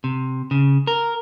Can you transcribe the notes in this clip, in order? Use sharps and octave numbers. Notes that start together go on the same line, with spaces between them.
C3
C#3
A#4